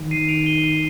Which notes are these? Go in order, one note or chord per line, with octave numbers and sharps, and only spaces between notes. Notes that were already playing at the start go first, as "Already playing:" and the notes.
Already playing: D#3
C7 D#7
D7 F7
D#7 G7